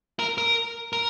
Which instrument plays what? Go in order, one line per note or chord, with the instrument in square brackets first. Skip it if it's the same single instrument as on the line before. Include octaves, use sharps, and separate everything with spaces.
[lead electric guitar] A#4
A#4
A#4